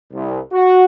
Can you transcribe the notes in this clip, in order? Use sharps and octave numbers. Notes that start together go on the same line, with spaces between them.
C2
F#4